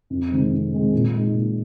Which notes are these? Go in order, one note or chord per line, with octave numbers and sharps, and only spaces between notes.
F2
C3 D#3 G#3 C4
F2
C3 D#3 G#3 C4
A#2
G#3 D#4
A#2